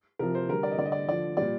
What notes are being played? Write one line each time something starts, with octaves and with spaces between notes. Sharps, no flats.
C3 F3 A#4
C5
D3 G3 A#4
D5
D#5
D3 G3 D5
D#5
D5
D3 F3 D5
A#2 G3 D5